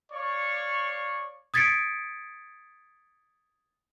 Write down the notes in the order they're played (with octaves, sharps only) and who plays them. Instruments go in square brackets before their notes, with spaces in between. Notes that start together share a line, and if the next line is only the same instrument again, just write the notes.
[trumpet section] C#5 D5 F5 C#6
[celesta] D#6 G#6 A6 B6 C#7 D7